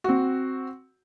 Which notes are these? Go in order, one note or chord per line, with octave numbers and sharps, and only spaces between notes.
C4 F#4